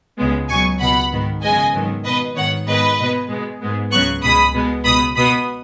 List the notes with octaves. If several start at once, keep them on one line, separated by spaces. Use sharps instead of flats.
C#2 C#3 G#3 B3
C#2 B2 F#3 B3 G#5 C#6
C#2 B2 B3 F#5 B5
G#2 D#3 B3
F#2 C#3 G#3 B3 D#5 G#5
G#2 D#3 F#3 B3
B2 B3 B4 D#5
G#2 D#3 B3 C#5 F#5
G#2 D#3 G#3 B3 B4 D#5
B2 G#3 B3
B2 G#3 B3
G#2 G#3 B3
C#2 C#3 F#3 B3 C#6 F#6
C#2 B2 G#3 B5 D#6
B2 G#3 B3
C#2 B2 B3 B5 D#6
B2 B3 B5 D#6